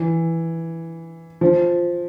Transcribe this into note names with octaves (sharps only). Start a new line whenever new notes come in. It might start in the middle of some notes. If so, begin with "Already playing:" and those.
Already playing: E3
F3